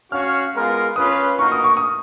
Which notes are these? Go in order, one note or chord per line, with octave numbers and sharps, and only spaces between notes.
C#4 F#4 C#5 F5 F6
G#3 B3 F4 A#4 F5
C#4 F4 B4 D#6
A#3 D#4 F#4 A#4 C#6
D#6
C#6
D#6